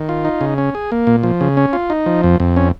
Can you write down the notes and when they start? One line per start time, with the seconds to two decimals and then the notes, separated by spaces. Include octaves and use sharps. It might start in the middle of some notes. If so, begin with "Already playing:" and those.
Already playing: D#3
0.09 F4
0.25 D#4
0.41 C#3
0.58 C#4
0.75 G#4
0.92 A#3
1.07 A#2
1.23 F3
1.41 C#3
1.57 C#4
1.73 F4
1.90 D#4
2.06 F3
2.24 F2
2.40 F2
2.56 C#4